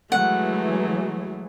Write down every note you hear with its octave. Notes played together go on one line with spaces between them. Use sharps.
E3 F#3 G#3 A3 F#5